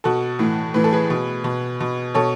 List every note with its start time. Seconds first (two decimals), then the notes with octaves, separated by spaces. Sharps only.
0.04 B2 F#4 A4
0.39 A2 E3
0.74 A2 E3 B4
0.84 A4
0.92 G#4 B4
1.10 B2
1.44 B2
1.81 B2
2.14 B2 A4 C#5